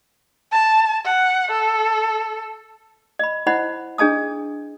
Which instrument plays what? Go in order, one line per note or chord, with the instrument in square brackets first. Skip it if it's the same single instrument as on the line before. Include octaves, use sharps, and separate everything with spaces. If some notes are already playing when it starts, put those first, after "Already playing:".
[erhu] A5
F#5
A4
[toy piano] D#5 B5
E4 C5 D#5 F#5 B5
D4 G#4 D#5 A5 D#6